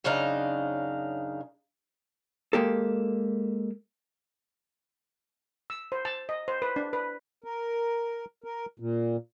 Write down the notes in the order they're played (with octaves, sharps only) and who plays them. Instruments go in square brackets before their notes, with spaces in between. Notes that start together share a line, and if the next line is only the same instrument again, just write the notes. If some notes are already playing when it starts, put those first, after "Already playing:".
[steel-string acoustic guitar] F#2 C#3 D4 D#4 F5 A#5
[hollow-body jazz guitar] G#3 A#3 G4 A4
[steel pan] E6
C5
A5
D#5
C5
B4
D4
B4
[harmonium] A#4
A#4
A#2